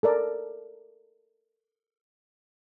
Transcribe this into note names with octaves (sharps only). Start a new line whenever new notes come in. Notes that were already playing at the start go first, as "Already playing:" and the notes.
A4 A#4 D5